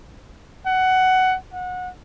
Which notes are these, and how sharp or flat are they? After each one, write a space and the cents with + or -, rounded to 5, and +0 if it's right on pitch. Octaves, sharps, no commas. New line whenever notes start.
F#5 +15
F#5 -25